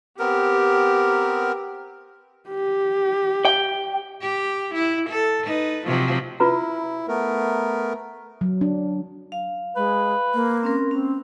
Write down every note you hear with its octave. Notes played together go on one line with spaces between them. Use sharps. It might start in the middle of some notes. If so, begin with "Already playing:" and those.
B3 C4 G4 A#4
G4
G5
G4
E4
A4
D#4 B4
C3 F3 F#3
E4 F4 B4 A#5
A3 B3 A#4
F#3
D4
F5
G#3 B4
A#3
C4 C#4 A#4
C4 C#4